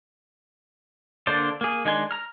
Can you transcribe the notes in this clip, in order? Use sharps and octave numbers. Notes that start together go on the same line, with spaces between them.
D3 A#3 D4 C5 D5
A#3 G#4
D#3 G#3 D4 G#5 C6
A#5 F6